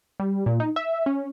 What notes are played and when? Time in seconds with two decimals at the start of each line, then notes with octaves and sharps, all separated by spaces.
0.20 G3
0.46 A#2
0.60 D#4
0.76 E5
1.06 C#4